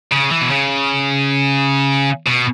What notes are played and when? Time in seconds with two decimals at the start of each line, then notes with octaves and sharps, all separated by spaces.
0.12 C#3
0.31 E3
0.42 B2
0.51 C#3
2.27 B2